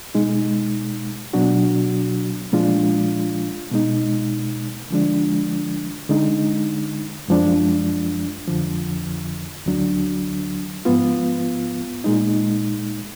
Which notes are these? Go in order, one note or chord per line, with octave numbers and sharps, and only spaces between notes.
B2 G#3 D#4
B2 F#3 D4 F#4
A#2 F3 G#3 D4 F4
B2 G#3 D#4
D3 F3 G#3 D4
D3 G#3 D#4
F#2 F3 G#3 D4
F2 D3 F3
D2 D3 F#3 D4
G#2 F3 B3 F4
A#2 G#3 D#4